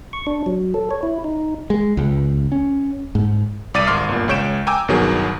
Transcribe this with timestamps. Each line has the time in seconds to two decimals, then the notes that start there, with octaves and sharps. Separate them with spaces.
0.13 C#6
0.27 D4
0.46 F#3
0.74 A4
0.91 C#5
1.03 E4
1.24 D#4
1.70 G#3
1.97 C#2
2.52 C#4
3.15 G#2
3.74 C2 D5 D6 A6 D#7
3.87 G#1 C6 D6 F6 C7
4.09 G1 A#2
4.28 C#2 G#3 C#5 G6 D7 E7
4.67 G5 G#5 A#5 D6 E6 G6
4.88 G1 B2 D#3 F#3 G#4